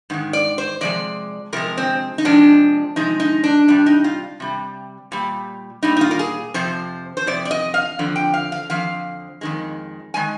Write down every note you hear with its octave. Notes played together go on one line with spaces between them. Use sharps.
G#2 D#3 G#3
D5
C5
C3 F3 G#3 D5
C3 F3 G#3 A#4
C4
D#4
C3 F3 G#3 D4
C3 F3 G#3 D#4
D#4
D4
C3 G3 D4
D#4
F4
C3 G3
A#2 G3
A#2 G3 D#4
D#4
F4
A#4
G#4
F2 C3 F3 C5
C5
F2 C3 D5
D5
D#5
F5
F2 D3 F3
G5
F5
F5
F2 D3 F3 F5
F2 D#3 G#3
D#3 G#3 G#5